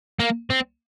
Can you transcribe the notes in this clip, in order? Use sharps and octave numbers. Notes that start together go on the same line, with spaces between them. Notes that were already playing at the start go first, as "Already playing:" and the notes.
A#3
C4